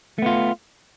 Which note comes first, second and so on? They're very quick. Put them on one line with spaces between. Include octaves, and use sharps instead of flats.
A3 B3 F4